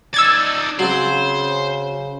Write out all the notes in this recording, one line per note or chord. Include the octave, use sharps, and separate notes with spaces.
D#4 D5 E6 G#6 A6
C#3 F#3 C4 C5